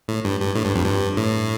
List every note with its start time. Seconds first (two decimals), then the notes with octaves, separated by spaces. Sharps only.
0.08 A2
0.25 G2
0.40 G2
0.55 A2
0.65 G2
0.75 F2
0.86 G2
1.17 A2